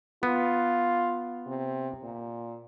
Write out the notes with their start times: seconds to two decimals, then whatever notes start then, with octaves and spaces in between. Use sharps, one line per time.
0.23 B3 F4
1.47 C3
2.03 A#2